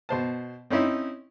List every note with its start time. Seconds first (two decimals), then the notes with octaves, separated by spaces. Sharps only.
0.09 B2 C5 A5
0.70 C4 C#4 D#4 E4